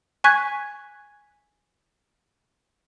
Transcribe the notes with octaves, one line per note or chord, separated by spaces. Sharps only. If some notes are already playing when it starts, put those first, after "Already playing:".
G#5 C#6 F#6 G#6 B6